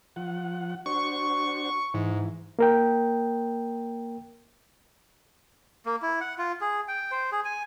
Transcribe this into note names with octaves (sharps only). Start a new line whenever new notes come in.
F3 F#5
D4 F#4 C5 C#6
G#2 E3
A#3 A#4 G5
A#3
E4
F#5
F4
G#4
G5
C5
G#4
G#5